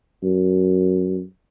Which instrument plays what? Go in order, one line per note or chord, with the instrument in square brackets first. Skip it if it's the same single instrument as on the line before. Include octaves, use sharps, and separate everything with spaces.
[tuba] F#2